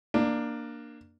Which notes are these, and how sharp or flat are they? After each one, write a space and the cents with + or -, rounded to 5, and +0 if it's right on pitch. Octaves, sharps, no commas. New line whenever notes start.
A#3 +0 D4 +15